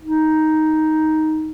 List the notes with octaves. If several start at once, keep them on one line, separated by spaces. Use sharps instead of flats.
D#4